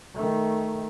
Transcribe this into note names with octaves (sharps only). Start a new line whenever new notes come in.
D#3 A3